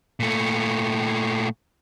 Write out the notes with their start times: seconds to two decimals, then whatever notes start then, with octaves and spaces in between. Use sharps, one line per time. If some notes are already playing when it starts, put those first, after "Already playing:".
0.20 A#2 A3